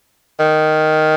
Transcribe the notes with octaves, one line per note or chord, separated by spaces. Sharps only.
D#3